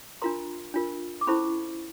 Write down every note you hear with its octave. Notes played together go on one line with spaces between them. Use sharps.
D4 F4 A#4 A#5 C6
D4 F4 A#4
D6
C#4 E4 A4 C5 B5 C#6